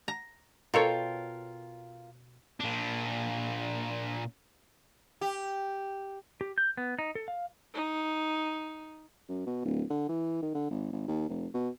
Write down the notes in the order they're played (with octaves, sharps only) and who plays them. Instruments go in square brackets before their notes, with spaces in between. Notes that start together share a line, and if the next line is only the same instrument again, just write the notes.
[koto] A#5
[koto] B2 A4 C#5 [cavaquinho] F4 A#4 G5
[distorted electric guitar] A#2 D4
[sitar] G4
[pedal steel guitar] G4
G6
B3
D#4
A4
F5
[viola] D#4
[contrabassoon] F#2
B2
D1
D3
E3
D#3
D3
G#1
G#1
D#2
F1
B2